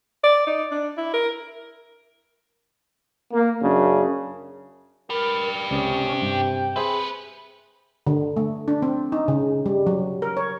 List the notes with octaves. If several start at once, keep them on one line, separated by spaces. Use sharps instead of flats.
D5
D#4
D4
E4
A#4
A#3
F#2 C#3 D4
G4 A#4 B4
C#2 C3 C#4 D5 D#6
G2 G5
C4 G#4 B4 C5 E5
D3
A3
D4
C4
D#4
C#3
G3
F#3
A#4
C#5